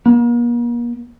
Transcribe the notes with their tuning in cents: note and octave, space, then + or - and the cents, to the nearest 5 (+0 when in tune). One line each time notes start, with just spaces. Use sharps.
A#3 +40